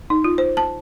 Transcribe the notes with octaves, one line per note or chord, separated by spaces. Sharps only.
D#4
F4
C5
A5